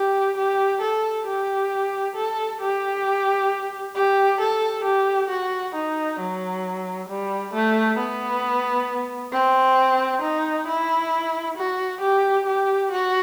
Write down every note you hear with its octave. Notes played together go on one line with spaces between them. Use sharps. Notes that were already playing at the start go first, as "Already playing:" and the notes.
Already playing: G4
G4
A4
G4
A4
G4
G4
A4
G4
F#4
D#4
F#3
G3
A3
B3
C4
D#4
E4
F#4
G4
G4
F#4